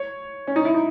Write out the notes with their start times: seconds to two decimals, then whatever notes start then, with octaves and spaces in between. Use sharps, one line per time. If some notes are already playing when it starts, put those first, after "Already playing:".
Already playing: C#5
0.47 C#4
0.56 D#4
0.65 E4
0.74 D#4